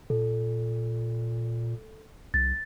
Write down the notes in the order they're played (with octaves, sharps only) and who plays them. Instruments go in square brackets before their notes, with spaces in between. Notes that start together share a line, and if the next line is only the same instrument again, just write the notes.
[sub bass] A#2 [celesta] A4
[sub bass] C2 [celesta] A6